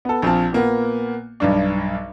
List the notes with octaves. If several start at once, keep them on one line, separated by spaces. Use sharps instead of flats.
B3 A4
A#1 C4 F4 A5
A#2 A#3 B3
B1 G2 D4